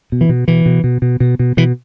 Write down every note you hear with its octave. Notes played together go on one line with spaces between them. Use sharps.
B2
E3
B2
B2 E3
B2
B2
B2
B2
B2
B2 E3